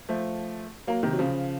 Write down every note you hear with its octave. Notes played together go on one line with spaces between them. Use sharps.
F3 A3
F#3 A#3
C3 D#3
F#3
C#3 F3